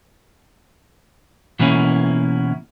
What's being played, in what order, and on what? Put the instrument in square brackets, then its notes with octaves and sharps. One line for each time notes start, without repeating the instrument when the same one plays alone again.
[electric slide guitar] B2 E3 A#3 C#4 E4